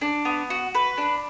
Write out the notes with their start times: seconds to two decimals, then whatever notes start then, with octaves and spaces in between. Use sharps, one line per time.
0.01 D4
0.25 B3
0.50 F#4
0.75 B4
0.98 D4